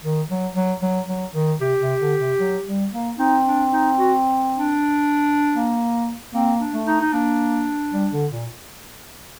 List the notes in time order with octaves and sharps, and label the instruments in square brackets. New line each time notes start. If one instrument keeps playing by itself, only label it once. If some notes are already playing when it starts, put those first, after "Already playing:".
[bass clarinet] D#3
F#3
F#3
F#3
F#3
D#3
[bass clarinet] C3 [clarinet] G4
[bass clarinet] C3
D3
C3
F#3
G3
A#3
[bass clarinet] C4 [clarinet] D#4
[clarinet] D4
D#4
F#4
D4
[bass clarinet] A#3
[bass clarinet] A#3 [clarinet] C4
[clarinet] D4
[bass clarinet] A3
[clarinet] D#4
D#4
[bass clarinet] A#3 [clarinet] D4
[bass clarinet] G3
D3
A#2